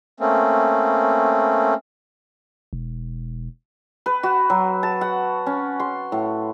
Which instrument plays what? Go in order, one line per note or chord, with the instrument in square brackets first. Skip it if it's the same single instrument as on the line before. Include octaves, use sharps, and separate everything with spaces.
[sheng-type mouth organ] A3 A#3 C4 C#4
[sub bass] E1
[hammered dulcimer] B4
F#4
F#3
A5
F#5
C#4
C6
A2